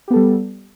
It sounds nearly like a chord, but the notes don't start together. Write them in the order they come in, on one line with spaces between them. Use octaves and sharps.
G4 B3 A4 G3